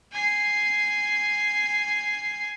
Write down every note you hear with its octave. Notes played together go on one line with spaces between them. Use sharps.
G#5 C7